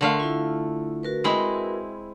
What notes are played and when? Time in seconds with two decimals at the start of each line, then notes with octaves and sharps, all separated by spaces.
0.01 D3 A3 A#4 F5 C6
0.20 E4 F4
1.03 F#4 A#4 B4
1.24 G#3 C4 E4